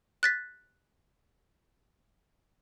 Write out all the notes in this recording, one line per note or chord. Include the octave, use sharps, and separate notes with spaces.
F#6 A6 B6